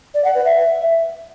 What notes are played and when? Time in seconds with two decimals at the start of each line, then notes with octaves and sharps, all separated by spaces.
0.14 D5
0.25 F#5
0.35 B4
0.45 E5